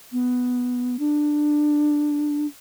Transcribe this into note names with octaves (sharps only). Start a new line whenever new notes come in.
B3
D4